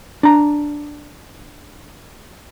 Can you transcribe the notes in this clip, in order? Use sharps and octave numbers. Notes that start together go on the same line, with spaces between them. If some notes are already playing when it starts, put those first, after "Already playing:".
D4 A#5